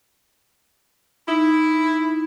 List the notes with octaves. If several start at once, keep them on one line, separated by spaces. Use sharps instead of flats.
D#4 E4